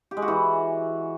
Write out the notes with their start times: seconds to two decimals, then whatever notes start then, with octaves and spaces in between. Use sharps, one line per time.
0.11 G4
0.17 G#3
0.22 F#4
0.28 E3